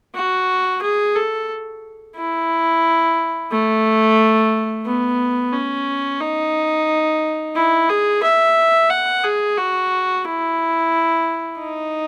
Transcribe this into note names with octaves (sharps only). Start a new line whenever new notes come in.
F#4
G#4
A4
E4
A3
B3
C#4
D#4
E4
G#4
E5
F#5
G#4
F#4
E4
D#4